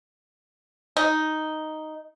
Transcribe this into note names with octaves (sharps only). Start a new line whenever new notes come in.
D#4